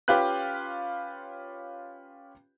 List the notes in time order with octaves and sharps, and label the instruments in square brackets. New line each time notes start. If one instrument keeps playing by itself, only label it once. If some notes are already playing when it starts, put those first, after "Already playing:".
[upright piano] C#4 F4 G4 B4 F#6